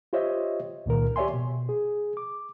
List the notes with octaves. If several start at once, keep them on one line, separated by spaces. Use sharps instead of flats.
F4 G4 C5 C#5 D#5 E5
C#2 A#2 D#3 A#4
G4 C#5 D5 E5 G#5 C6
B2
G#4
D6